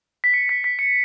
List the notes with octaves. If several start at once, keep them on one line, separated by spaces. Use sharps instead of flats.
B6
C#7
B6
B6
C#7